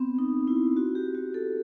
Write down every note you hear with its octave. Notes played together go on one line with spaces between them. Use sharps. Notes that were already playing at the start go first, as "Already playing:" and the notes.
Already playing: B3 C4
D#4
E4
F#4
G4
F#4
A4